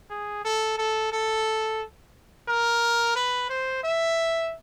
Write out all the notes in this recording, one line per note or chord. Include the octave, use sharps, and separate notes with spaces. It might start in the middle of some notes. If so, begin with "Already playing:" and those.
G#4
A4
A4
A4
A#4
B4
C5
E5